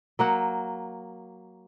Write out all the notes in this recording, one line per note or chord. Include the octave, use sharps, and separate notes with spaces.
F#3 A#3 F#5